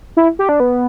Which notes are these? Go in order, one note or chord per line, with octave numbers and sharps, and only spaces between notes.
E4
G4
D4
B3